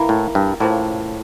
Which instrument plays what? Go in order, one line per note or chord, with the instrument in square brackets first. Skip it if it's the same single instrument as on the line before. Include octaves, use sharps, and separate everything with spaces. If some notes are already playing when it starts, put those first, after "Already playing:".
Already playing: [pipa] E3 A#3 E4 A#4
[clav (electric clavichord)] A2
G2
[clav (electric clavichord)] A2 [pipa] C#3 F3 A#3